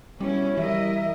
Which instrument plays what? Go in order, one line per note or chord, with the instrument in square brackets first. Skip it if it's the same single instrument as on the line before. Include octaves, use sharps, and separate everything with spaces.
[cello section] B2 C#4 E4 [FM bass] G3
[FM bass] E3 [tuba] G3 [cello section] E4 A#4 D#5 [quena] E5